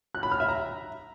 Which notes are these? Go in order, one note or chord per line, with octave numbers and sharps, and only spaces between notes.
F#6
B5
F6
E5
A#5